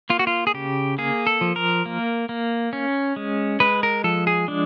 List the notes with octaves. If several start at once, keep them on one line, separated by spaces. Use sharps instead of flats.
A#3 F4
F#4
F4
G#4
C#3 G4
A#3 G#4
A4
F3
A#4
A#3
A#3
C#4
G#3
G#3 B4
A#4
F3 A4
G#4
G#3 D4